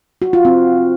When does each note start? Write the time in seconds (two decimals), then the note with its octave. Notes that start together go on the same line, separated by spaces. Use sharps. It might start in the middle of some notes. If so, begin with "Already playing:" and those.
0.22 F#4
0.33 F4
0.45 C4